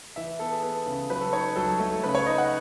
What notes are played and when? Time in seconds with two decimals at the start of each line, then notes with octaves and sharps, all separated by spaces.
0.16 E3 E5
0.39 B3 A4
0.51 G#4
0.62 B3 A4
0.86 C#3
1.10 F#3 B4
1.21 A4
1.32 D#4 C#5
1.56 F#3 A4
1.79 A3
2.03 C#3 B4
2.15 C#5
2.26 D#4 D#5
2.38 F#5